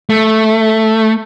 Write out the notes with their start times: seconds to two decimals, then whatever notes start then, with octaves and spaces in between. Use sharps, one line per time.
0.10 A3